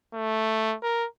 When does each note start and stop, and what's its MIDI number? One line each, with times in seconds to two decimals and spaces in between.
0.13 0.76 57
0.83 1.06 70